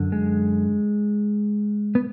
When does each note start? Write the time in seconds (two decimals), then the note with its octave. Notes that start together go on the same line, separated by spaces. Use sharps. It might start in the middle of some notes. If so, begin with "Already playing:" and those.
Already playing: F#2 D3
0.12 G#3
1.95 B3